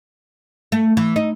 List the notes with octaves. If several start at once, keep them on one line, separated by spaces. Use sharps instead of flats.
A3
E3
D#4